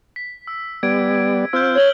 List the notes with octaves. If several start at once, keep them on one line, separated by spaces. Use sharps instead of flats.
B6
E6
G3 B3 D5 G#6 D7
C4 F4 C5 E6 F6 G6
C#5 G#6 F#7 G7